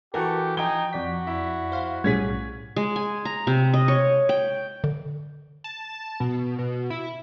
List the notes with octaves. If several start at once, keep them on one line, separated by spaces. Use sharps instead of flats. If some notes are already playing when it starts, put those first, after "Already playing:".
E3 F#4 G4 A4 A#4 C#6
F3 D#4 G5 G#5 G7
F2 F#4 D5 B6
E4
C5 F5
B1 A2 G3 C#4 G#4 G#6 B6
G#3
G#5
A#5
C3
D#5
C#5
G5
D3
A5
B2
B2
E4